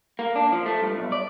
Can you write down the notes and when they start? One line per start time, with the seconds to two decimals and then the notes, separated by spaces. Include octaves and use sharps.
0.19 A#3
0.36 D4
0.52 F3
0.66 A3
0.82 G2
0.97 B1
1.12 D5